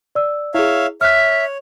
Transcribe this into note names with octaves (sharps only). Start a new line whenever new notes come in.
D5 E6
E4 G#4 C#5 E5 F5
C#5 E5 F6 F#6